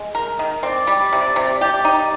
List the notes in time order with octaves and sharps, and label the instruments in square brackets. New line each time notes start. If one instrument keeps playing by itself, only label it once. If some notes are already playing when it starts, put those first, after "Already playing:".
Already playing: [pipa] G#3
A#4
D#3
[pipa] C4 [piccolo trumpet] D5
[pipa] G3
C3
C3
[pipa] G4 [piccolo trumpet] D5
[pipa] D#4